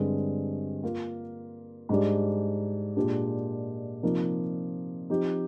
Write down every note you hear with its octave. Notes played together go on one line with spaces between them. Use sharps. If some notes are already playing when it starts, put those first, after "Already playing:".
Already playing: G2 D3 G#3 C4
A#3 F4 A#4
G#2 G3 D4 G4 D5
A#2 G#3 D4 G4
C3 F3 A#3 D#4
F3 C4 D#4 G4